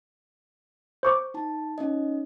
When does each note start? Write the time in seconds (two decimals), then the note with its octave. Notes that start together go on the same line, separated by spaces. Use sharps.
1.03 C5 C#6 D6
1.34 D#4 A5
1.78 C#4 D#4 D#5